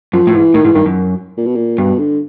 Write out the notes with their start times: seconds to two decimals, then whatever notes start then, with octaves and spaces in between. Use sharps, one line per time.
0.13 F#2 F3
0.27 A2
0.34 G#2 E3
0.54 A2 D#3
0.65 G#2 E3
0.75 G2 D#3
0.86 F#2
1.38 A#2
1.46 B2
1.55 A#2
1.78 G2 B2
1.99 D3